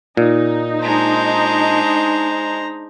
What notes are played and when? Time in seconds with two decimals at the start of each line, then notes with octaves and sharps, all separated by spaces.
0.17 A#2 D#4
0.82 G#3 D4 C5 A#5